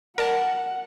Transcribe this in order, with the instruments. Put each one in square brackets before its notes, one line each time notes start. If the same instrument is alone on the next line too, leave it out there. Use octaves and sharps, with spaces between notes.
[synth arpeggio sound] A#4 D5 A5 [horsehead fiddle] F#5